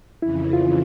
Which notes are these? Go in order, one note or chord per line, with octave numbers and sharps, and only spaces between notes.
F2 C#3 E3 E4
F4